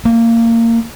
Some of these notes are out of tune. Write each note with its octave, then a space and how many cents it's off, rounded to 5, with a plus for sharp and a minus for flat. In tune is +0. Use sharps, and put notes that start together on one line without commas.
A#3 -20